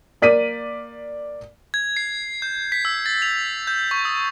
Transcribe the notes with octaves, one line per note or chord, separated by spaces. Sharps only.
A#3 D5 B6 D#7
G#6
C7
G6
B6
E6
A6
F7
G6
C#6
D#6